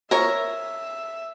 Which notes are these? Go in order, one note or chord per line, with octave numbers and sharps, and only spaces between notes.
A#4 C#5 E5